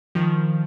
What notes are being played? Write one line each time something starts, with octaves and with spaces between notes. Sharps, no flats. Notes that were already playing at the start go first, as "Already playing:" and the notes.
D#3 F3